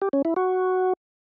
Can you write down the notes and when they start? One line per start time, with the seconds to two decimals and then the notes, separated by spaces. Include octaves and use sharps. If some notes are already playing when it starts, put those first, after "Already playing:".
0.02 G4
0.13 C#4
0.25 E4
0.36 F#4